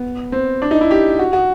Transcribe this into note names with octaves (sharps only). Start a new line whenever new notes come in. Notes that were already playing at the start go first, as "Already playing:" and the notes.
Already playing: B3
C4
D4
D#4
E4
G4
F#4
F#4